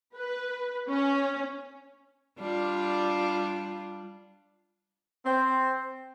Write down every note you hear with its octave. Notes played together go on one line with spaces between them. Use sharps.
B4
C#4
G3 D4 F4
C4